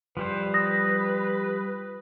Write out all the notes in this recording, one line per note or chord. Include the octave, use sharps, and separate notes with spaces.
F3 G3 B4 C5
D#6 A#6